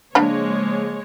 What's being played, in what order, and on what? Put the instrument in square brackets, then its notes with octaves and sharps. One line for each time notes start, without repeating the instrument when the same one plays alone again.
[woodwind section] C#3 F3 A#3 [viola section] G#3 C#5 [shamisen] D4 B5